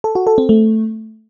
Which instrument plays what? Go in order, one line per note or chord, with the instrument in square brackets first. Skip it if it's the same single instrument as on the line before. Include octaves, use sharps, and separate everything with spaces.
[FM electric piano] A4
F#4
A4
C4
A3